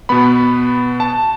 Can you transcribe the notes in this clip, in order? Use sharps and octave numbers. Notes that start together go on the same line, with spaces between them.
B2 B3 B5
A5